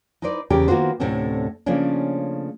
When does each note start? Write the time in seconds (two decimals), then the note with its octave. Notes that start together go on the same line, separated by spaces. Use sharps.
0.22 D#4 E4 B4 C5 D5
0.50 E2 C#3 G4 A#4
0.68 D#3 A#3 B3 F4 F#4 C5
1.00 D2 A2 C3 A3 C4 C#4
1.66 C#3 F3 A3 A#3 C#4 D4